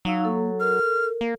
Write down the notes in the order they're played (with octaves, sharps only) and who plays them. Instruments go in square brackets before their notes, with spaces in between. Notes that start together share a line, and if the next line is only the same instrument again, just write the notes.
[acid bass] F#3 [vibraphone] D#4 F5 E6
[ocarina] A#3 [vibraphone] A4
[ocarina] A#4 [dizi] F6
[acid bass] A#3